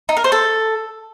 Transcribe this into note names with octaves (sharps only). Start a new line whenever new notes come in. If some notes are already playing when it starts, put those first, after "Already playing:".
D#4
A#4
C5
A4